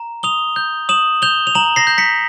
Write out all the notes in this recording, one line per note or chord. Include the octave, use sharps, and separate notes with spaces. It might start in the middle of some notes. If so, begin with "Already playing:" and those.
Already playing: A#5
D#6 F7 G7
G6
D#6 E7 F#7
G6 F7 G7
F7
A#5 E7 F#7
A#6 C7
G6
B6 C#7